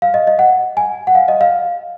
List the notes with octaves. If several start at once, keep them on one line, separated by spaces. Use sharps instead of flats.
F5
D#5
D#5
F#5
G#5
F#5
F5
D#5
F5